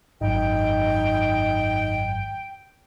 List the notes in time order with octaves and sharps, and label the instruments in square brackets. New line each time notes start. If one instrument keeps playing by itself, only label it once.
[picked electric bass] G#1 F#2 [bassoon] D#4 [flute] G5